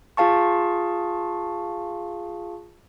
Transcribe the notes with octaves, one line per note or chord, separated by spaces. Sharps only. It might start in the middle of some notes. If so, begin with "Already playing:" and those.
F4 G#4 F5 A5 C#6